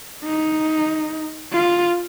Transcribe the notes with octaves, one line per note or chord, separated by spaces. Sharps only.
D#4
F4